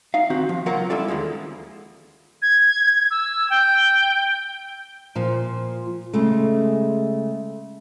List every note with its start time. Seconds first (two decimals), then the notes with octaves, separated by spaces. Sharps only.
0.14 D#4 F5
0.30 D#3 C4 F#4 G4
0.49 F3
0.66 C#2 F#3 A#3 F4 A#4 F#5
0.90 G3 C#4 E4 F4 A4 D5
1.08 D#2 D3 F3 G#3
2.42 G#6
3.11 E6
3.50 G5
5.15 A#2 F3
6.14 C#3 G#3 A3